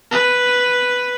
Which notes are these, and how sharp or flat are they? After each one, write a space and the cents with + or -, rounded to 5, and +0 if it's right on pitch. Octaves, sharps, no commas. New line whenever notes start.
B4 +0